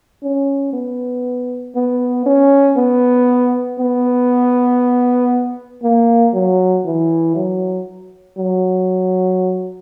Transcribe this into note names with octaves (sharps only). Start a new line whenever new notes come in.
C#4
B3
B3
C#4
B3
B3
A#3
F#3
E3
F#3
F#3